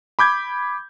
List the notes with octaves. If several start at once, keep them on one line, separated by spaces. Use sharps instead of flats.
B5 D6 G6 G#6